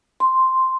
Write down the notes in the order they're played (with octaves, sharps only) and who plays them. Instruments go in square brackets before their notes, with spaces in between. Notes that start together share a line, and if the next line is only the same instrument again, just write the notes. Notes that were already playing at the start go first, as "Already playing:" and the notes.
[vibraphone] C6